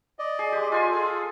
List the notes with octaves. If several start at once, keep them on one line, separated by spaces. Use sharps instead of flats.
D5 D#5
G#4
G#3 G4
F4 G#5 C6
G#4 A4